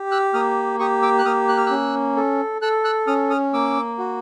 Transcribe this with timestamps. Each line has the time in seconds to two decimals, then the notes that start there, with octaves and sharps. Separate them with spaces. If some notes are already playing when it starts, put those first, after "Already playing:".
Already playing: G4
0.11 E6 F#6
0.34 A#3 D#6 F6
0.79 G4 C#6 D#6
1.02 D6 E6
1.19 F#6
1.25 A#3 D#6 F6
1.48 F#6
1.57 F6
1.66 C#4 E6 F#6
2.16 A4
2.62 A4 E6 F#6
2.84 E6 F#6
3.07 C#4 D#6 F6
3.30 D#6 F6
3.53 A#3 D6 E6
3.98 F#4